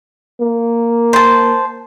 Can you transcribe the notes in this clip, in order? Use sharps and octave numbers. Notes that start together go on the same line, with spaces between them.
A#3
C5 A5